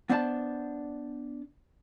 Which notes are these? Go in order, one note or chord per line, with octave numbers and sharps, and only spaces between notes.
B3 D4 C5 D5 A5